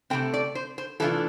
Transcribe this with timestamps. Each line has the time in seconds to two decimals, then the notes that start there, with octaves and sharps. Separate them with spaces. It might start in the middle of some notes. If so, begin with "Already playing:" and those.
0.10 C3 E3 A3 C4 G5
0.34 D5
0.55 C5
0.78 C5
1.00 C3 E3 A3 D4 F4 A4